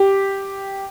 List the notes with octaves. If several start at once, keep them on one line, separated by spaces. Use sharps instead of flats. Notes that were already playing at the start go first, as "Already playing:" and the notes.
Already playing: G4